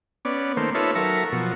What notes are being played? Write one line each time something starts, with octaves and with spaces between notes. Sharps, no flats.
B3 C#4 D5
D#3 A3 A#3 C5
D#4 F4 A4 B4 C#5 E5
F#3 A4 A#4 E5 C#6
B2 F3 F#3